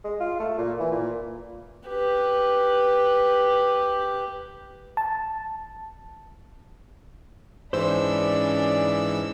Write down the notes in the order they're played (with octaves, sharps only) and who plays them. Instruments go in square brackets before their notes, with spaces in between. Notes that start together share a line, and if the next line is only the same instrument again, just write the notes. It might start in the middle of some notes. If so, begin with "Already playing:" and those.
[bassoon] G#3
F4
A3
A#2
E3
A#2
[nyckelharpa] G4 B4
[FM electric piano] A5
[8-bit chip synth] G#2 E3 E6 [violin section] C#4 D4 B5 [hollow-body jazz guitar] C5 [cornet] D5